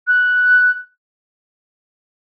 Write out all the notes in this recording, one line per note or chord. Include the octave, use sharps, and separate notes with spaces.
F#6